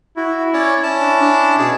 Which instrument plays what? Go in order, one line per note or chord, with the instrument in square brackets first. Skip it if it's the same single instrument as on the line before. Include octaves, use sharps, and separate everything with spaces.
[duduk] E4 [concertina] F#4
[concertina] C#4 C#5 D5
C#4 E4 A5
[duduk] D4
D4
[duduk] B2 [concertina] G#4 D5